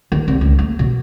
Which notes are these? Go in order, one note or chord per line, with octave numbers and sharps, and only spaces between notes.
D#3
C2
C#2
A#3
B2